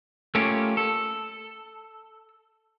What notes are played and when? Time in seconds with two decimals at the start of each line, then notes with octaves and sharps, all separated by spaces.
0.35 A3 A#3 C#4 F4 G4
0.77 A4